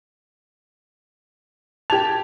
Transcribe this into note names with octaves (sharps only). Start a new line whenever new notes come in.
G4 A5 G#6 F7